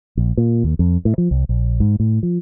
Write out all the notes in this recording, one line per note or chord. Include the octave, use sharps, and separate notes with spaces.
A#1
A#2
D#2
F2
A2
F3
C2
A#1
G#2
A2
F3